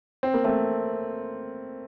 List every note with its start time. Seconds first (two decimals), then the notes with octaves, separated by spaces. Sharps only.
0.23 C4
0.34 A#3
0.44 A3 C4